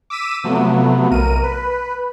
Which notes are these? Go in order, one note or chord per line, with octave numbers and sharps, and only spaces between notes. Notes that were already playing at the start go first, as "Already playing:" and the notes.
D6 E6 B6 D#7 E7
C3 F3 F#3 A3 B3
B1 A#4 D#7
B4